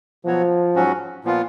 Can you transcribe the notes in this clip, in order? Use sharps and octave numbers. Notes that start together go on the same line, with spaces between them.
B2 F3 F#3 B3 F#4 C#5
G#2 F#3 C#4 F#4
A#2 F3 B3 F4